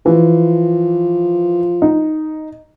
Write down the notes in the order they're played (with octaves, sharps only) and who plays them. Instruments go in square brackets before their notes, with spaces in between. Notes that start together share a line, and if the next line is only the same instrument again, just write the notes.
[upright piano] E3 [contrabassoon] F3
[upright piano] D#4